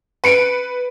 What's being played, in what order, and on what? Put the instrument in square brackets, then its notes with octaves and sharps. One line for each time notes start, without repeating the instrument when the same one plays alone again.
[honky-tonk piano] B4 C#7 D7